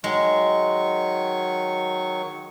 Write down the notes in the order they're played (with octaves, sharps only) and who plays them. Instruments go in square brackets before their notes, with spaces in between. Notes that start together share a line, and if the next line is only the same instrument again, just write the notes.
[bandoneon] D#3 F#3 C#6 [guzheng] G#3